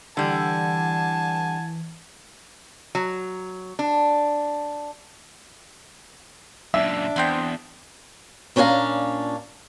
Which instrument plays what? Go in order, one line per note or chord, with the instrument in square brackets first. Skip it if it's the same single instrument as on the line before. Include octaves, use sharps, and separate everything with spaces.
[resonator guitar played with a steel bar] D3 G3 [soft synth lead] E3 [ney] F#5 [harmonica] G#5 A5
[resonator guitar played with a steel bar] F#3
D4
[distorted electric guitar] F#2 A#2 [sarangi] D4 [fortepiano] E5
[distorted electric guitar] E2 [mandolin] B3 C4 G5
[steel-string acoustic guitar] A#2 C#4 D4 C#5 F5 A#5